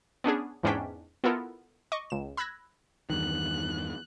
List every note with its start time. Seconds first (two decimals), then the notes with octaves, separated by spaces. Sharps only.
0.24 B3 C#4 D4 G#4
0.63 E2 G#2 C#4 D4 G5 B6
1.24 B3 E4 F4 A4 A#4
1.92 D#5 C#6 D6
2.10 C#2 E7
2.37 B5 E6 F#6 G#6 A#6
3.10 E2 G2 D#3 F#6